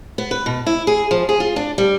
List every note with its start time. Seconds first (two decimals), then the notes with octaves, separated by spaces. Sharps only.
0.18 B3
0.31 B4
0.46 B2
0.67 E4
0.87 G#4
1.11 F3
1.29 G#4
1.40 F4
1.56 D4
1.78 G3